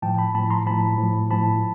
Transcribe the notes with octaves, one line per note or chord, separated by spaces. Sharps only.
A2 F3 G5 A5
A5 B5
A2 F3 A5 B5
A#5 C6
A2 F3 A5 B5
A2 F3
A2 F3 A5 B5